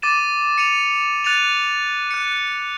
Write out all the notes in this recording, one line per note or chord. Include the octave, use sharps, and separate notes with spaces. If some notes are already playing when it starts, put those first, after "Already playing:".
D6 A6 D#7 E7
C#7 D#7 F7
F#6 A6 C#7 D#7 F7
F#6 C#7